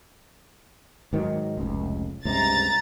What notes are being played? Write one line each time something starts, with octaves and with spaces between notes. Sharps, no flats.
G#2 D#3 F#3
F1 C#2
C#2 G2 C3 A#5 A6